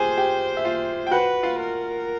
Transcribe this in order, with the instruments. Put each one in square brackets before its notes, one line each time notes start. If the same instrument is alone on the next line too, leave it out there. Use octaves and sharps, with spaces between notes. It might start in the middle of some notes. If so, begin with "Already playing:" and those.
Already playing: [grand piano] F4 G4 G#4 G#5 [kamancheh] C5
[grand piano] G4 G5
E5
F4 F5
G5
[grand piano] F#4 F#5 [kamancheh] B4
[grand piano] F4 F5
[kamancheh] A#4